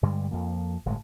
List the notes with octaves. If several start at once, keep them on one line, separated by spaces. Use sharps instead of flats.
G2 D3 G3 G#3
F2 F3 A#3
G1 A2 G#3